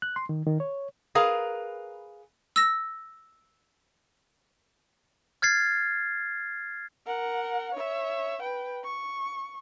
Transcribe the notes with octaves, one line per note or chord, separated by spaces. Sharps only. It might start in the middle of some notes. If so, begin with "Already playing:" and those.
F#6
C6
D#3
D#3
C#5
G#4 A#4 B4 F5
E6 A#6
F6 G#6 A6 C7
A#4 F#5
C#5 E5
B4 G5
C#6